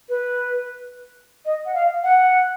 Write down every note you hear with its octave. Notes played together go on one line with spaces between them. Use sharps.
B4
D#5
F#5
F5
F#5